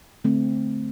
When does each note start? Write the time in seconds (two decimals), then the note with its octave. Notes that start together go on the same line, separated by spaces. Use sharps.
0.24 D3 A3 C4